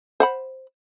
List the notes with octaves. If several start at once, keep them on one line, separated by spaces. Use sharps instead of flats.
C5 F#5 B5